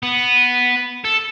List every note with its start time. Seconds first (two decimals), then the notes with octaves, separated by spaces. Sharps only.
0.03 B3
1.04 A4